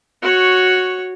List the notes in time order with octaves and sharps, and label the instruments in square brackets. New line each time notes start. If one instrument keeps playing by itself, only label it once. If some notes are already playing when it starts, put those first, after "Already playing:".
[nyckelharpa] F#4 C#5